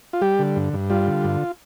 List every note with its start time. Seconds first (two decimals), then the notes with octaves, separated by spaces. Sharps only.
0.13 F4
0.21 G3 G4
0.39 D3
0.56 G2
0.73 G2
0.90 G3 F4
1.07 D3
1.24 G2